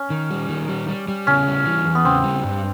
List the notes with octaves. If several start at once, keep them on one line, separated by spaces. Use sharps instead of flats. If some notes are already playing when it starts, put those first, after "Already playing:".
Already playing: C#4
D#3
G3
D#3
G3
G3
G3
C#3 C#4
G3
E3
E2
B3
C#3 C4
G3
G2